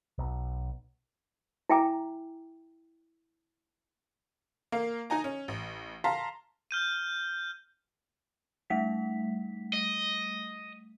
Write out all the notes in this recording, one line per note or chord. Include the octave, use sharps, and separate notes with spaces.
B1
E4 E5 G5 G#5 A#5 D6
A#3 F5
D#4 D#5 G#5 A#5
C#4
A1
F5 A5 A#5 C6 B6
F6 G6 D#7
G3 A3 B6
D#5